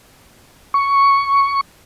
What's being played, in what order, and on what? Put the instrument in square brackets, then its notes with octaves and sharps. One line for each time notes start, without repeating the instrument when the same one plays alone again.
[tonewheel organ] C#6